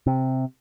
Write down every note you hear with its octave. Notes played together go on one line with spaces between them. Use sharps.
C3